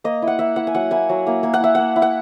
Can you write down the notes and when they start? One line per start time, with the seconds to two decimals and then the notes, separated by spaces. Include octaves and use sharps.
0.04 A#3 D#5
0.22 E4
0.27 F#5
0.39 A#3 E5
0.56 E4 F#5
0.67 G#5
0.75 F#3 F#5
0.91 A#3 E4 G#5
1.09 F#3
1.27 A#3 E4
1.43 A#3 G#5
1.54 F#5
1.60 E4 E5
1.75 A#3 F#5
1.96 E4
2.02 F#5